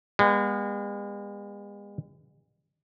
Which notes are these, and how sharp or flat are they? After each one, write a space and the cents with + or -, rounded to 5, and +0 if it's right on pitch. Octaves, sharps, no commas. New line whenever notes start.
G#3 -40 B3 -25